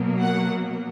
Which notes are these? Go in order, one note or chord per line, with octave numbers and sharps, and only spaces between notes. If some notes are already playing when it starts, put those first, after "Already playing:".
Already playing: B2 F#3 A#3
F#5